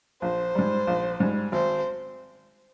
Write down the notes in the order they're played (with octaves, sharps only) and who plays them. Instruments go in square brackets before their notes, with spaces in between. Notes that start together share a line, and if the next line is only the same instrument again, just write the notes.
[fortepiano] A#1 [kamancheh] C5
[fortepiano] G#2 G3
A#1
G#2 G3
[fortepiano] G#1 [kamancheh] C5